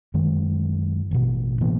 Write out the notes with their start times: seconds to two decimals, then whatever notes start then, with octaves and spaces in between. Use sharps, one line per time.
0.14 F#2 D#3 G#3
1.11 A1 B2
1.61 A2 E3 A#3 B3